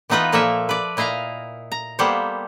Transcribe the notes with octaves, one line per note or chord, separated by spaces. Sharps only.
E3 B3 D#4 F4 B4 D#5
A#2 F3 A#3 A4 A#4 E5
B4 D5
A#2 E4 D#5 F5 A#5
A#5
G3 A#3 B3 A4 C5